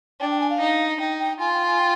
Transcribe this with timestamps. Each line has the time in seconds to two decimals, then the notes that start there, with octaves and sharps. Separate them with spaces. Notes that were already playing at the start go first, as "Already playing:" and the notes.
0.20 D4 G5
0.31 G5
0.41 G#5
0.50 F5
0.60 D#4
0.99 D#4 G5
1.20 G5
1.40 F4 G#5
1.53 G5
1.66 G#5
1.79 G5